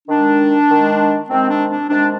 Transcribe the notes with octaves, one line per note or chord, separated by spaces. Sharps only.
D#3 G#3 D4
D#3 G#3
C3 D#3 G#3 C4
D4
D4
C3 D#3 G#3 D4